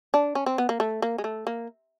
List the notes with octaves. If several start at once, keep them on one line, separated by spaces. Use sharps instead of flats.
D4
C#4
C4
B3
A#3
A3
A#3
G#3
A3
A#3